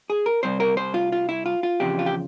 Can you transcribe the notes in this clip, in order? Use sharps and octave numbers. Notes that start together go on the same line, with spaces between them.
G#4
A#4
C2 A#2 G3 C4 C5
A#4
C5
F4
F4
E4
F4
F4
E2 C#3 F3 C4 G4
F4
G4